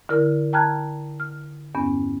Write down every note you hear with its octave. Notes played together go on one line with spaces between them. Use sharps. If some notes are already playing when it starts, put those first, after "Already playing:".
D3 E4 A#4 F6
G5 A5 A#5 F6 F#6 G#6
F6
E2 G2 B3 C#4